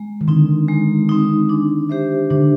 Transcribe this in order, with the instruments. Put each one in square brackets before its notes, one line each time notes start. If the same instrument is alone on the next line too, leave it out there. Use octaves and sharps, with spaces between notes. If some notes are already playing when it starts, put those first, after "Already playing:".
Already playing: [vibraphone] G#3
[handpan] D#3
[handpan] D3 [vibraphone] C4 D#4
[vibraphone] G#3
C4 D#4
D4
G4 C5 E5
[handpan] D3 [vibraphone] D4